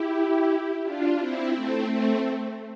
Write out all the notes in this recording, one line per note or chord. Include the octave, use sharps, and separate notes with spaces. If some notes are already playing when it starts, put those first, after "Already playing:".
Already playing: E4 G4
D4 F4
C4 E4
A3 C4
A3 C4